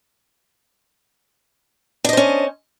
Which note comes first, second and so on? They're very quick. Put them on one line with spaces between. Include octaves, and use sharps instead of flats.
D4 D#5 C5 C#4